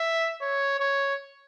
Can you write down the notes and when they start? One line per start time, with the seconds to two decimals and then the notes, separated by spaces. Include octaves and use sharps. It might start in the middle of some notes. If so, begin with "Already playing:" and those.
Already playing: E5
0.41 C#5
0.80 C#5